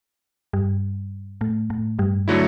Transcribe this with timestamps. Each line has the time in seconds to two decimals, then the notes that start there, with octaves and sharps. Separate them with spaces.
0.53 G2 G3
1.41 A2 A3
1.70 A2 A3
1.99 G2 G3
2.28 D3 F#3 A3 E4